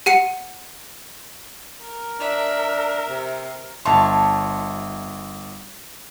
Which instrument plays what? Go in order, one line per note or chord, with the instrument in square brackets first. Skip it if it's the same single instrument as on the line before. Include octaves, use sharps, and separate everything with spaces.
[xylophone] G4 F#5 C#7 D#7
[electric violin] A#4
[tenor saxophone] D4 [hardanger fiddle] E5
[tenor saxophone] D4
C3
[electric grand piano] G1 E5 C6 [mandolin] C#5 A5